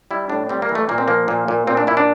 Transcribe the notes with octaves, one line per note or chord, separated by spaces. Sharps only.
G3 E4
A2 D4
G3 C4
A#3
E3
A3
A#2 A#3
C4
F3 A#3
A#2
A#2
A#2 C4
D4
A#2 E4
D4